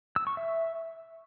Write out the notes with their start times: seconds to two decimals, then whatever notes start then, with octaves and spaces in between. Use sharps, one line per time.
0.16 E6
0.27 C#6
0.37 E5